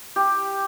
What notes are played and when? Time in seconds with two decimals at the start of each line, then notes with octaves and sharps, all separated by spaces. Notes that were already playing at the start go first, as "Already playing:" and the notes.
0.16 G4